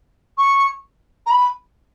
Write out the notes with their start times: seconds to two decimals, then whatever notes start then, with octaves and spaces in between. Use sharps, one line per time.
0.38 C#6
1.26 A#5
1.30 B5